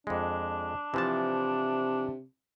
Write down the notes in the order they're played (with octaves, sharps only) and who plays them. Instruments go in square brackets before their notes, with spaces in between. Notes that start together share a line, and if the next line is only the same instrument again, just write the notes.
[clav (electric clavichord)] F2 G#3 [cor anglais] D4
[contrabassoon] C3 [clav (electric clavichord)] E3 F3 A5